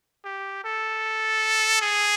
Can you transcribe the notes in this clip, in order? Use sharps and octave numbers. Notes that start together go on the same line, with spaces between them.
G4
A4
G#4